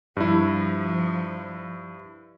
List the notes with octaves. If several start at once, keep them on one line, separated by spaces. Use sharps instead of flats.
G2 F3 E4